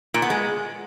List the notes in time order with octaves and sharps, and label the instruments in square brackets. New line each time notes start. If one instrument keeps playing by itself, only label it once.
[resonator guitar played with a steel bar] A#2
B3
G#3